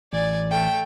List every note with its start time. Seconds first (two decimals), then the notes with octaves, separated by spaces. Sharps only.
0.13 A1 D5 G#5
0.51 A3 G5